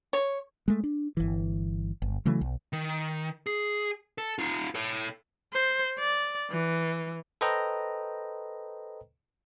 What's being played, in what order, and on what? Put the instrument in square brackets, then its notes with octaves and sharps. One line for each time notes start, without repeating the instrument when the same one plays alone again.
[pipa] C#5
[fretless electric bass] G#3 A3
D4
G1 E3
G1
C#3 E3 F#3 A3
B1
[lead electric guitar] D#3
G#4
A4
D#4 F4
A4 C#5
[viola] C5
D5
E3
[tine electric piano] A4 B4 C5 D#5 G5 A#5